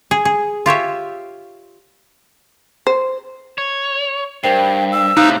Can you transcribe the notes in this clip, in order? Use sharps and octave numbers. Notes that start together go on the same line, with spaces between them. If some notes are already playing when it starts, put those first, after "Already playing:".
G#4
G#4
F4 G4 C#5 E5
C5
C#5
G2 A#4 C5 G5 C7
E6
A2 C3 D#4 F5 D#6 F#6